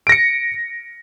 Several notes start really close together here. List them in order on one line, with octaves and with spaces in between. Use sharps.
D7 A#6 C#7